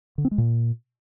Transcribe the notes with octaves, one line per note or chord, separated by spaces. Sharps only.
D3
C4
G#3
A#2